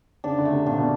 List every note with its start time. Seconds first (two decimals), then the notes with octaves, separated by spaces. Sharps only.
0.24 C#3 D4
0.38 D3
0.45 A3
0.52 C3
0.66 A#2 D4
0.78 B2